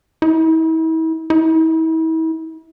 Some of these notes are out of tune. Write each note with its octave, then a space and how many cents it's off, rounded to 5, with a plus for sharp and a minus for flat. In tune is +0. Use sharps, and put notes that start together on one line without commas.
E4 -40
E4 -40